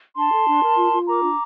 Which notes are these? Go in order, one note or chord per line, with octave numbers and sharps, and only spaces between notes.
D4 A5 C6
A4
D4
A#4
F4
F4
A#4 A#5 D6
D4